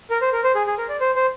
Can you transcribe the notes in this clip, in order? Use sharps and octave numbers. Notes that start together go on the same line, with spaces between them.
A#4
C5
A#4
C5
G#4
G#4
A#4
D5
C5
C5